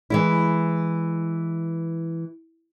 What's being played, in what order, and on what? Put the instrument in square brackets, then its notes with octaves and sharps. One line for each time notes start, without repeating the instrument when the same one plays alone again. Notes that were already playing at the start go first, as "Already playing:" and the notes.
[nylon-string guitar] E3 G#3 E4